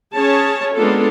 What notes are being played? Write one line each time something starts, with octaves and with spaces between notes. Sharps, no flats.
C#4 G#4 C#5 A5
G#3 A#3 B3 D4 F4 A4